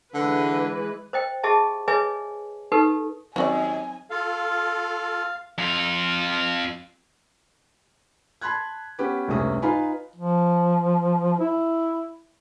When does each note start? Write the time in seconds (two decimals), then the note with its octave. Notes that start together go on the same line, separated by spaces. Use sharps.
0.14 D3 E3 G#3 B4
1.13 C5 D#5 G5
1.43 G4 G#4 D#5 E5 A5
1.88 G#4 B4 C#5 D#5 E5 G#5
2.72 D#4 G4 A4 B4
3.36 D#2 F#3 C4 C#4 F#4 D5 G#5
4.10 F4 A4 F5
5.58 F2 F4
8.41 A5 B5 C6 F#6 G#6
8.99 B3 C#4 G4 B4
9.28 F1 C#2 G2 C3 C#4 D#6
9.62 D#4 F4 B4 F5 G#5 B5
10.16 F3
11.40 E4